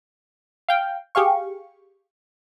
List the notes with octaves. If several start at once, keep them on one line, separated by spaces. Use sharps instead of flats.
F5 G5
G4 G#4 F5 C#6